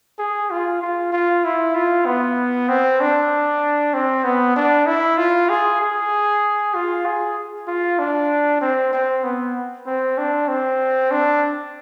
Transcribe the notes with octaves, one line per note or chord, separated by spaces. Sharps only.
G#4
F4
F4
F4
E4
F4
B3
C4
D4
C4
B3
D4
E4
F4
G#4
G#4
F4
G#4
F4
D4
C4
C4
B3
C4
D4
C4
D4